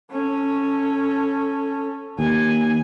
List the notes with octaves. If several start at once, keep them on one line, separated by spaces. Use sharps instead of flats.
C#4 A4
D#2 G#5